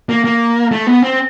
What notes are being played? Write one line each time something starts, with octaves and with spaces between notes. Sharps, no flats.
A#3
A#3
A3
B3
C4